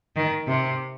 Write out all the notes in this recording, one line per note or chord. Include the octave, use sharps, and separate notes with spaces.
D#3
C3